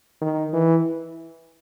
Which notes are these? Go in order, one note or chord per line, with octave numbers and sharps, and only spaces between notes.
D#3
E3